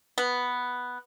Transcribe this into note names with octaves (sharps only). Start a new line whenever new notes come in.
B3